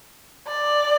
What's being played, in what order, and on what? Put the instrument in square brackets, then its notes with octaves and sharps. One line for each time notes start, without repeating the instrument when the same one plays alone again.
[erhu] D5